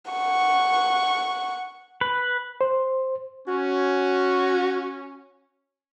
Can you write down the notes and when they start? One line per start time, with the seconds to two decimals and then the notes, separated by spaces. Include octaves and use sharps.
0.11 F#5 C#6
2.01 B4
2.61 C5
3.48 C#4 F#4